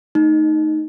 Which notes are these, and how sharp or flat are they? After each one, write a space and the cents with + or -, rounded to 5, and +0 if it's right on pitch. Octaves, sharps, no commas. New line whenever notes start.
A3 +0 D#4 -5